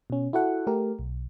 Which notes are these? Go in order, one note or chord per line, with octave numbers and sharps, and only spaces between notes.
B2 C#4
E4 F#4 A4 F#5
A3 G4 A#4
B1